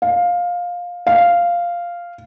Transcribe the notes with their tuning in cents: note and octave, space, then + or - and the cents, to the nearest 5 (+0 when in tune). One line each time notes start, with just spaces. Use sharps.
F5 +15
F5 -5